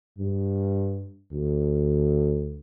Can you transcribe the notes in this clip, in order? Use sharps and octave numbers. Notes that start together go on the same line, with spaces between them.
G2
D2